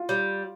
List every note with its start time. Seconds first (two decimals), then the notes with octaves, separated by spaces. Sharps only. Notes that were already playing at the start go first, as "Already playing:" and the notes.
Already playing: F4
0.09 G3